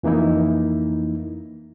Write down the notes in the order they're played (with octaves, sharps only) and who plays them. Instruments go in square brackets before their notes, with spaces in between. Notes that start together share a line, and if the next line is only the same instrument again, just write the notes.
[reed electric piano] F2 E3 A#3 D#4 E4